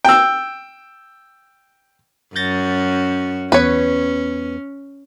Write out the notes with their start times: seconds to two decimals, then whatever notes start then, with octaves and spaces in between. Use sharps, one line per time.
0.05 G5 E6
2.36 F#2 C#4 F#4 G6 A6 A#6
3.52 E2 B3 C#4 B4 C#5